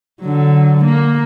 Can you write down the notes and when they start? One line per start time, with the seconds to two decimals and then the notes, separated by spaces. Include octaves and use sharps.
0.21 D3 F#3
0.84 A#3